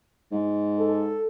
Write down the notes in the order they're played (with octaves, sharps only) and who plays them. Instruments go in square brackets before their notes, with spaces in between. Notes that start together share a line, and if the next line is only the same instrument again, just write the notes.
[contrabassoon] G#2
[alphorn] A4